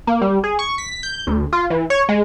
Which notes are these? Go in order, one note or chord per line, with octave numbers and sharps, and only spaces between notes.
A#3
G3
G#4
C#6
B6
G6
D2
F4
E3
C#5
G#3